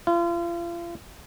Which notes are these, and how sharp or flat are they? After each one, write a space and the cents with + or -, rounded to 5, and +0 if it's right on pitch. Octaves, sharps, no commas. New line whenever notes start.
F4 -35